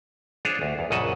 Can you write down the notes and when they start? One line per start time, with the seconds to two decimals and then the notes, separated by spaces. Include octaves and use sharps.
0.45 D4 F4 G#4 C5 C#5
0.62 D2
0.79 E2
0.90 A#1 F#2 C#3 D#5 F#5 A5